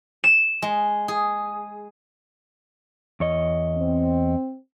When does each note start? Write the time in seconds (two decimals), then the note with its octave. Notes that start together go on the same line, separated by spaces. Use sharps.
0.24 E7
0.62 G#3
1.08 G#4
3.20 E2 C#5 D#5
3.76 C4